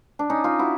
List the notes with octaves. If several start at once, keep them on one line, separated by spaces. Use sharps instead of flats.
D4
C#4 D#4
D#4 F4
E4 F#4